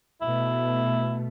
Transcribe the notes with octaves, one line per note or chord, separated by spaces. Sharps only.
B2 A3 E4